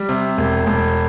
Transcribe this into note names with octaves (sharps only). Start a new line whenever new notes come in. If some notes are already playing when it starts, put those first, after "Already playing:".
Already playing: G3
C3
E1
E1